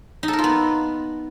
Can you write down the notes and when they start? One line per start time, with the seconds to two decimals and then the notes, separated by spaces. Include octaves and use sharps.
0.23 D#4
0.28 A4
0.33 A#4
0.39 F4
0.44 B3